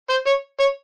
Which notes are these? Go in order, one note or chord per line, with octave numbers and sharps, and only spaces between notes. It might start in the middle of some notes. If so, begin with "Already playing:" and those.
C5
C#5
C#5